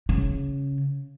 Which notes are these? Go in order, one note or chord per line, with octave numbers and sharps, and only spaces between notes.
C#3